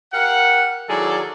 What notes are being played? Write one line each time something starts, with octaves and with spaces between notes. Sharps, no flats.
G4 A#4 F5 F#5
D#3 F#3 E4 G#4 A4 D5